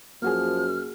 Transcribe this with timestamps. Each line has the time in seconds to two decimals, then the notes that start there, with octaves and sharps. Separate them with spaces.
0.22 F#2 F3 A#3 F#4 G#4 F6